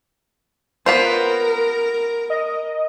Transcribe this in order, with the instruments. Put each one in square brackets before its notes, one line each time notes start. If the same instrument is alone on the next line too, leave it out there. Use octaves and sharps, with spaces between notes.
[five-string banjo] B3 F4 C5 [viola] A#4
[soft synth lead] D#5